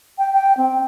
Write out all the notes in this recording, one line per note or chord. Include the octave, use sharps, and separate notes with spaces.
G5
G5
C4